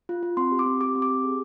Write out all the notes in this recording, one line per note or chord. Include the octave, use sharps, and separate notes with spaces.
F4
F4
C4 C6
G4
D6
C4
G4 D6
C4
D6
G4
G#4